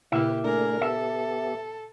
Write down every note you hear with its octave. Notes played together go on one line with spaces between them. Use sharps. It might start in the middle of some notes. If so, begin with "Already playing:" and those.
A#2 C#3 A#3 E4 G4 B4 E5
A3 D4 G#4 A#4
B3 G4 A4 E5